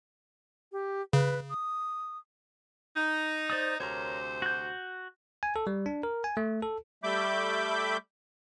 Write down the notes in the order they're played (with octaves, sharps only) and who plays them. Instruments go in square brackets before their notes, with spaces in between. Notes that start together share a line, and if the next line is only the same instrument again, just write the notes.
[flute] G4
[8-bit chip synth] C#3 [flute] B4
[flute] D#6
[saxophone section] D#4
[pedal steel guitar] C5 D5 D#6
[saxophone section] D2 C3 C5 [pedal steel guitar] A#4 C#5
[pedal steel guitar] F#4 G6
[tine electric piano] G#5
A4
G3
D4
A#4
G#5
A3
A4
[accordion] G3 A3 E5 B5 D6 G6